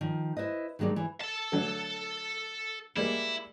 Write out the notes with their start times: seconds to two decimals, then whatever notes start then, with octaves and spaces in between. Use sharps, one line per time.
0.01 D#3 F3
0.37 E4 B4 C5 D#5
0.79 D#3 F#3 G#3 A#3 D4
0.96 E3
1.21 A4 A5
1.52 D3 F#3 A3
2.97 G3 G#3 A#3 E4